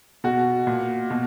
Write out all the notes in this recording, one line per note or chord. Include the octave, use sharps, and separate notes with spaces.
B2 F#4
A#2
B2